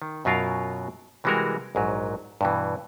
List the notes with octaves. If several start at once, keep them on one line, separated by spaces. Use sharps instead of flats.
D#3
F#2 B2 F#3 F4 A#4 F5
C3 E3 G3 G#3 F#4 A#4
A#1 G#2 F#3
G2 B2 E3